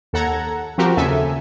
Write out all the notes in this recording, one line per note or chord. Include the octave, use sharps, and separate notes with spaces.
D#2 A4 F#5 A#5 G#6
F3 C4 F#4 G4 A#4
D#2 C#3 A4 E5 G#5